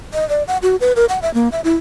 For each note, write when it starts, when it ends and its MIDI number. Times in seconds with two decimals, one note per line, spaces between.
0.14 0.27 75
0.29 0.43 74
0.48 0.57 78
0.62 0.76 66
0.81 0.93 71
0.96 1.05 70
1.09 1.19 78
1.22 1.32 76
1.34 1.49 58
1.52 1.61 76
1.64 1.75 64